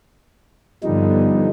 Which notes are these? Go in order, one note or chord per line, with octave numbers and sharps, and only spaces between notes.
G2 D3 F3 G3 B3 D#4